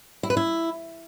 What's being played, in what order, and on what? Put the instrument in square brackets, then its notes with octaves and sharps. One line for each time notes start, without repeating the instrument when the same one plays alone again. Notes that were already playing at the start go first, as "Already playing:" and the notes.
[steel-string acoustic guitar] E4
B4
E4